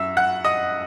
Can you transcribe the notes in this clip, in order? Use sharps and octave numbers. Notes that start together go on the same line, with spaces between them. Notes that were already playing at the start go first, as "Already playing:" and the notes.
Already playing: F#2 E5 E6
F#5 F#6
D#5 D#6